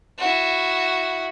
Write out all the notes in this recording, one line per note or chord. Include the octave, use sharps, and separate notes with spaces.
E4 F#4